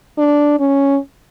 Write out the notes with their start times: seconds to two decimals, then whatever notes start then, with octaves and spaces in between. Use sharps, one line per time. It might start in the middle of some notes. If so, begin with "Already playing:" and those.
0.17 D4
0.59 C#4